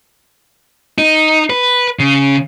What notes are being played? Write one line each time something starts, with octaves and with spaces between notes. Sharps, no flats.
D#4
B4
C#3